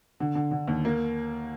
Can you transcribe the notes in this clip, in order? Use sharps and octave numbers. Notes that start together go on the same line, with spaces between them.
D3
D3
D3
D#2
A#3